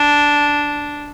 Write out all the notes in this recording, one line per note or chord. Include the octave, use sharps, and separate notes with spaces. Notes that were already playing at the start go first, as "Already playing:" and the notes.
Already playing: D4